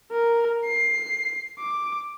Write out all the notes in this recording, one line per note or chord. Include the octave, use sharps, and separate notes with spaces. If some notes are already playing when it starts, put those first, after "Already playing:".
A#4
C7
D6